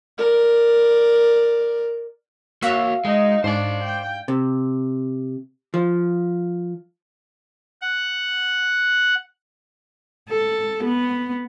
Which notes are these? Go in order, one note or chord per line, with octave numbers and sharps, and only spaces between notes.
A#4 D5
A#3 F#4 C#5 E5 F5
G#3 D#4
G#2 D4 C5 D5
G5
C3
F3
F#5
A4
B3